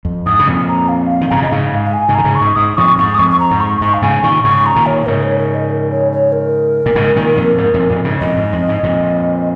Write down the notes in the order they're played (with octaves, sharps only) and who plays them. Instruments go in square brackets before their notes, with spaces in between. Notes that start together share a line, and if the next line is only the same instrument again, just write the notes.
[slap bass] F2
[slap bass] G#2 [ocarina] D#6
[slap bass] C#3
F2 A#2
[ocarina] A#5
F5
F5
[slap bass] D#3
[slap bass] G#2 C#3 [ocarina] A#5
[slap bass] A#2 [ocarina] D#5
[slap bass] G#2 C#3 [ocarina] F5
[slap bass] G#2
[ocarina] F5
G#5
[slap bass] G#2 C#3
[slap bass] D#3 [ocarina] A#5
[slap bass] G#2 C#3
[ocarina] C#6
[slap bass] G#2
[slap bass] G#2 [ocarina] D#6
[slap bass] F2 A#2 [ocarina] C#6
[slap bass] G#2 [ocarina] C#6
[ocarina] D#6
[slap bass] F2 [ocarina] C#6
[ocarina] C#6
A#5
[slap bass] G#2
[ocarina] C#6
[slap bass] G#2 [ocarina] C#6
[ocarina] F5
[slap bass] G#2 C#3 [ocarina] G#5
[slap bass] A#2 D#3 [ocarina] C#6
[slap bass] G#2 C#3 [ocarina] C#6
[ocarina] A#5
[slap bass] A#2 D#3
[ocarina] C#5
C#5
[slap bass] G#2 C#3 [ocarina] A#4
[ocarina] C#5
A#4
D#5
A#4
C#5
C#5
A#4
[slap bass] A#2
G#2 C#3
A#2 D#3
F2 A#2
G#2
F2 A#2
F2 A#2
G#2 C#3
[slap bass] F2 A#2 [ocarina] D#5
[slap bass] G#2
F2
G#2
F2 A#2